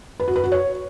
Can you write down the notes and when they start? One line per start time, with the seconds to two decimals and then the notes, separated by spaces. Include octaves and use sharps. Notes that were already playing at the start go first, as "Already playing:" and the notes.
0.20 B4
0.28 F#4
0.36 B4
0.44 F#4
0.52 C#5